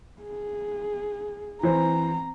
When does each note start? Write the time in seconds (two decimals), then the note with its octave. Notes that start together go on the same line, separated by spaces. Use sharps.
0.22 G#4
1.63 E3 C4 C5 A#5